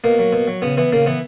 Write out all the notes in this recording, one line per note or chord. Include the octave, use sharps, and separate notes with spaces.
B2 A#3
F#3
B2
F#3
C#3 B3
E3 B3
C#3 A#3
E3 B3